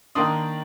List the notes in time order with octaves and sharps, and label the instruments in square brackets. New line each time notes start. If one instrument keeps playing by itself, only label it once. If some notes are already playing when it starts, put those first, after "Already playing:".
[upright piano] D#3 A#3 D4 C6 D#6